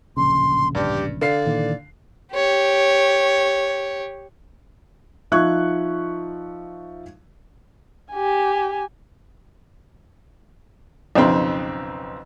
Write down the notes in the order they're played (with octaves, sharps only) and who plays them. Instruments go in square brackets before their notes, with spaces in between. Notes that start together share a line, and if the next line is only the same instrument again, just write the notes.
[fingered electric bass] D1 A#1 C#3 [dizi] C6
[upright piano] G2 [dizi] G4
[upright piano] D3 F5 C7 [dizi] D5
[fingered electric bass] A#2 D#3 E3
[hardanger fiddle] G4 C#5
[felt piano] F3 D#4 E5 C#6 F#6 G#6
[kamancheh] G4 G#5
[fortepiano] B1 F2 C#3 C4 C6